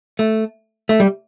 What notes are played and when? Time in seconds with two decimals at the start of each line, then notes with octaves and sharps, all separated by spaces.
0.19 A3
0.89 A3
1.00 G3